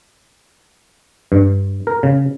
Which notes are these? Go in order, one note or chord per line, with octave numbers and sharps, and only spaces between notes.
G2
A#4
C#3